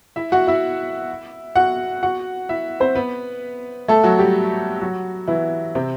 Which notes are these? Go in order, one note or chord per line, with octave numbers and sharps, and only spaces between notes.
E4 E5
F#4 F#5
E4 E5
F#4 F#5
F#4 F#5
E4 E5
C4 C5
B3 B4
A3 A4
F#3 F#4
G3 G4
F#3 F#4
E3 E4
C3 C4